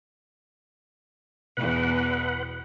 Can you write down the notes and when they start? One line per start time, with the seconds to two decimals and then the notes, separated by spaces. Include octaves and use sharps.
1.57 E2 B2 B4 F#5